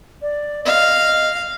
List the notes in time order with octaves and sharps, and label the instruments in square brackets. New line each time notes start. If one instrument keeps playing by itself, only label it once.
[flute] D5
[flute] D#5 [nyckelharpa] F5